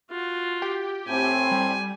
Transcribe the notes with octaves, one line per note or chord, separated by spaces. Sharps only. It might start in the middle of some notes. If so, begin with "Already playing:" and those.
F4 F#4
G4
A2 C4 G#5
G3